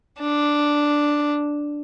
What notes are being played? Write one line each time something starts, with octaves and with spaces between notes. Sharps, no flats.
D4